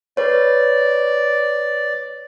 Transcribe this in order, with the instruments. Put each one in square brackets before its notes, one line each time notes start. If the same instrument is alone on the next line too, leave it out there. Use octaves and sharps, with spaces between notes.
[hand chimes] B4 C#5 [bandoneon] D5